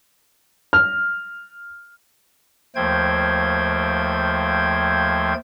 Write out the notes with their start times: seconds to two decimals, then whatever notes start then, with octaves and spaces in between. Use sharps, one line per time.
0.73 F6
2.76 D#2 F3 A3 C5 G5 G#6